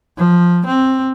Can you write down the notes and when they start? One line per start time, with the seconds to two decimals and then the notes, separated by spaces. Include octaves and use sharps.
0.18 F3
0.66 C4